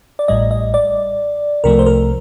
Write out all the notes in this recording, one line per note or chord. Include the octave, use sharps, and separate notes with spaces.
D5
A1 A2 G3 D#5
D#5
D5
C2 C3 F3 A3 A#4
C5
A#4